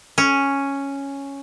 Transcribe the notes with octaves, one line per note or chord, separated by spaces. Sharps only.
C#4